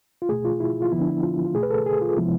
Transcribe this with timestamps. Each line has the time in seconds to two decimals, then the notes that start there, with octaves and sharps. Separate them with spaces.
0.22 F4
0.29 B2 A3 G#4
0.45 F4
0.60 E4
0.82 F4
0.92 D3 F3 B3 E4
1.00 D4
1.07 E4
1.23 F4
1.46 F4
1.54 B2 A3 G#4
1.63 B4
1.71 A4
1.86 G#4
2.02 F4
2.17 C3 F3 G#3 B3 E4